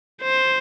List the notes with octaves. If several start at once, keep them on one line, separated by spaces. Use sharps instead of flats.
C5